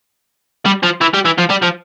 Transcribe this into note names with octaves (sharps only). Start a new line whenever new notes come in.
G3
F3
E3
G3
E3
F3
G3
F3